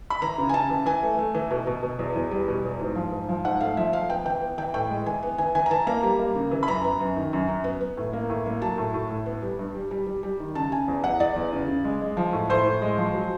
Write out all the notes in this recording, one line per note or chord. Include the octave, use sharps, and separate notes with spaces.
B5
E3 A#5
C#3
G#5
C#3 A5
E3
E3 G#5
A3
A3
E3
B2
B2
B2
E2
E2
G3
B2
E2
G#2
F3
G#2
F3
G#2 F#5
A3 F5
F3 E5
F3 F5
B3 G5
E3 G5
B3
E3 G5
A2 G5
G#3
E3 G#5
B3
E3 G#5
E3 G#5
A#5
E3 A5
A#3 A#5
G3
A#3
C#3
E3
B5
F#2 A#5
B3
F#2
D#3
F#2
F#2
B3
B3
A2
A#3
A2
A#3
F#3 A5
A2
A2
A2
B3
G3
G2
G3
G3
G3
G3
D#3
C#3 A5
C#3 G#5
E2
E2 F#5
E2 D5
E2
C#3
C#3
G#3
G#3
F3
A2
A2 C5
A2
G#3
F3
F#3